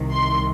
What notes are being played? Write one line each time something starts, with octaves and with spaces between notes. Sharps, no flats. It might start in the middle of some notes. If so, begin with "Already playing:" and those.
Already playing: C2 C3 D#3
C6